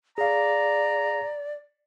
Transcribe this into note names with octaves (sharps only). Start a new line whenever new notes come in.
G#4 D5 F5 A#5